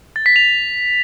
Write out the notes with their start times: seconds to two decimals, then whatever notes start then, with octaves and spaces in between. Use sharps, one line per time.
0.16 A6
0.26 B6
0.36 F7